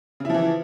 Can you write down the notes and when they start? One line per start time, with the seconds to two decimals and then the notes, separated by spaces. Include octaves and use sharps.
0.20 C#3
0.25 E4
0.30 F3
0.34 E3